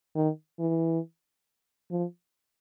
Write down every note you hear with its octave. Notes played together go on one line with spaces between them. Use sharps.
D#3
E3
F3